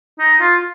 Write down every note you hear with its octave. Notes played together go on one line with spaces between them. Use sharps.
D#4
F4